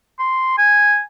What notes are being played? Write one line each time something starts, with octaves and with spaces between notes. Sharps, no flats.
C6
G#5